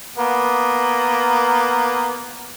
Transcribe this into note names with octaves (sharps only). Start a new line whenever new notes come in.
A#3 B3